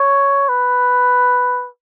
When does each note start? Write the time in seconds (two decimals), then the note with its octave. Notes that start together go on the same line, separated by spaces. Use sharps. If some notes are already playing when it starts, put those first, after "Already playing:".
Already playing: C#5
0.49 B4